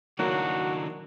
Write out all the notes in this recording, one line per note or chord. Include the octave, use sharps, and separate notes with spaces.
D#3 F#3 A#3 D4 E4 F#4